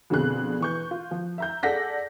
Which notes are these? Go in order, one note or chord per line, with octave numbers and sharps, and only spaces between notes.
F2 B2 D3 C4 G#4 F#6
E3 C#6 G6
F4
F3
E5 A#5 G6
G#4 A4 D5 F#5 A#6 B6